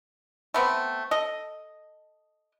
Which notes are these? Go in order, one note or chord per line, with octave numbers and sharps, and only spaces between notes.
A3 B3 C4
A4 D#5